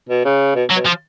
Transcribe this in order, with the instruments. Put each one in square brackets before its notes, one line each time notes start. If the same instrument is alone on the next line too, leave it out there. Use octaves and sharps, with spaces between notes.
[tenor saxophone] B2
C#3
B2
[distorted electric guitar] F#3
[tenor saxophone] B2
[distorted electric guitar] F3